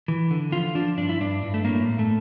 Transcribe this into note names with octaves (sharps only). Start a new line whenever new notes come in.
E3
D3
F3 F4
F3 D4
G2 D4
E4
G2 D4
G2
A3
A2 A#3
A2
A3